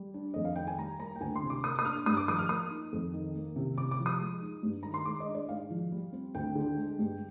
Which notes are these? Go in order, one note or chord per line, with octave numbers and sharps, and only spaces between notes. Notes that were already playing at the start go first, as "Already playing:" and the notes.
Already playing: G3
D4
F2 D#5
F5
D#3 G5
G#5
G3 A#5
A#3 A#5
G5
D2 G#5
C6
C3
D6
A#3 D#6
D#6
D4 F6
G2 D#6
D6
F3 D#6
F6
A#3 D#6
D#4
F2
D#3
A#3
C3
C3 D6
D6
F3
D#6
G#3
D#4
G2
D#3 A#5
C6
G#3 D6
D#5
D4
D5
G#2 F5
F3
G3
C4
D2 G5
D3
G#3
G2